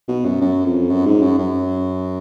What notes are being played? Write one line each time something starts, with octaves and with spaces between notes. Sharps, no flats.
B2
F#2
F#2
F2
F#2
G#2
F#2
F#2